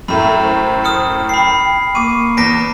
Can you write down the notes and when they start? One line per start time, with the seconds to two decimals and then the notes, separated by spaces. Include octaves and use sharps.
0.08 F#2 A2 A3 B5
0.42 C5
0.84 D#6 F6 C#7
1.29 G5 B5 C7
1.95 A#3 C#6 D6 D#7
2.37 E2 A#6 B6 D7